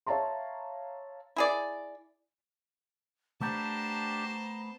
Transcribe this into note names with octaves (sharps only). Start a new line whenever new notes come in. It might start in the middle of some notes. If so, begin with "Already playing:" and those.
C#5 E5 F5 A5 A#5 C6
E4 G#4 D5
A3 B3 D4 G4 C5 G5 A5 A#5